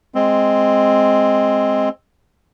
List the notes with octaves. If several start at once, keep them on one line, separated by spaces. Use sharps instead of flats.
G#3 C4